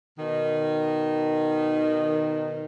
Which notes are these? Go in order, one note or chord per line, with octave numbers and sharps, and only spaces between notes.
B2 D#3